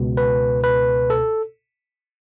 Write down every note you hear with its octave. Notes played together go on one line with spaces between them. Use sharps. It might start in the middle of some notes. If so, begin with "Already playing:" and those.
Already playing: C#2 B2
B4
B4
A4